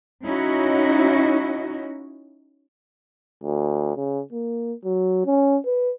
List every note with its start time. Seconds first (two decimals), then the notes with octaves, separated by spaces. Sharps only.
0.25 C#4 D#4 E4 F#4 D#5
3.43 D2
3.96 C#3
4.33 A#3
4.85 F#3
5.26 C#4
5.66 B4